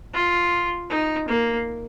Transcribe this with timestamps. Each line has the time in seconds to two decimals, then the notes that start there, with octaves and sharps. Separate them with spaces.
0.14 F4
0.90 D#4
1.28 A#3